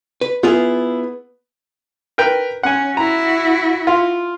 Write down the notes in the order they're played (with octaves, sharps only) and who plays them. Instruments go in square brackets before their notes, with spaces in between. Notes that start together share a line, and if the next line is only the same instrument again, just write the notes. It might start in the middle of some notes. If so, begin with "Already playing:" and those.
[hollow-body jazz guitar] B4
[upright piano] B3 [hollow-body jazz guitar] E4 F4 G#4
[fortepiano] A#4 B4 G5
[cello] C#4 [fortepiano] F#5 G#5
[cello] E4 F#4 [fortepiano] A#5
[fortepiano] F4